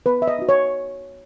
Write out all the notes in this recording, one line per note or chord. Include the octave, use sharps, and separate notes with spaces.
B3 B4
E5
D#5
D#4 F#4
C#5